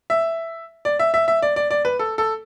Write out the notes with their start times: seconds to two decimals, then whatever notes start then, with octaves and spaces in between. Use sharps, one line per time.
0.10 E5
0.85 D5
0.99 E5
1.14 E5
1.28 E5
1.42 D5
1.56 D5
1.71 D5
1.85 B4
1.99 A4
2.18 A4